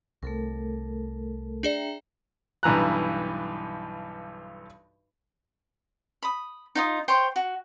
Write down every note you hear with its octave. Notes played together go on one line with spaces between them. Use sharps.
C2 A3 A4 A#4
D4 G#4 D5 E5 G5 A#5
B1 G2 E3 A#5 F#6
B5 D#6
D#4 F4 D#6
C5 C#5 G5 C6
F#4